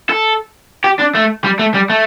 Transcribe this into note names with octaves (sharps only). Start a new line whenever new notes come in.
A4
G4
D4
A3
G3
A3
G3
A3